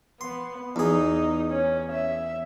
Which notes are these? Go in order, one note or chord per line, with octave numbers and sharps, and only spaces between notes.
B3 C6
E2 D#4 G#4
C#4
E5